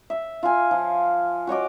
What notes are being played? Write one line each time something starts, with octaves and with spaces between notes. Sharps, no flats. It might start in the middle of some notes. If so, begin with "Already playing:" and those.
E5
F4 G#5
F3
F#4 C#5 D#5 D6